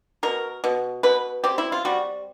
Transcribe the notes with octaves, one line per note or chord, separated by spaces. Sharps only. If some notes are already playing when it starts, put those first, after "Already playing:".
B2 A#4
B2
B2 B4
C4 G4
E4
F4
G3 F#4